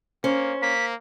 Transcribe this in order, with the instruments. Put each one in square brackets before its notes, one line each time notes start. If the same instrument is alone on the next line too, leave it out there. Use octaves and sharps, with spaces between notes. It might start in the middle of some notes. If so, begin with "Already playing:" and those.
[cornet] A#3 [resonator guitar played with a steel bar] C#4 [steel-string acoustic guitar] C5
[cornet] A#3 [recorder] B6